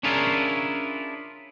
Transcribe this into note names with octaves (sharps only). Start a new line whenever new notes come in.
C#4 D4 E4 F4 G#4 A#4